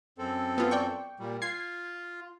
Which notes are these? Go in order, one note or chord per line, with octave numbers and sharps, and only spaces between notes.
F#2 C4 A4
B3 F4
D5 G5 C#6
A#2 G3
F4 G#6 C7